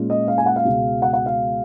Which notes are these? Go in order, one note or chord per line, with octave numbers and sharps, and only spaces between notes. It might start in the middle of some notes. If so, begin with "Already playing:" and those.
Already playing: A#2 G#3 C#4 F4
D#5
F5
G#5
F#5
F5
C#2 B2 G#3
F#5
F#5
F5